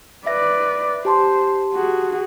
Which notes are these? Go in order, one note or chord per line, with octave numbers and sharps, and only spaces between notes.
B4 D5 E5 A#6
G4 C5 A5 C6
F#4 G#4